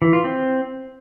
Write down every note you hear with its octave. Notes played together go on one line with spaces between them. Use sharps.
E3
F4
C4